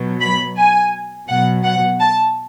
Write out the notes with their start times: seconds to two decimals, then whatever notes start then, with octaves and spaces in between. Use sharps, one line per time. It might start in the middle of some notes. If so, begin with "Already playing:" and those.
Already playing: B2 F#3
0.21 B5
0.57 G#5
1.28 B2 F#3 F#5
1.64 F#5
2.00 A5